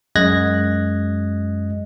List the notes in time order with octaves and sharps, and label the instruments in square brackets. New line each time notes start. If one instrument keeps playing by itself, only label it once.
[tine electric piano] F#2 G#3 D#5 F#6 G#6 A#6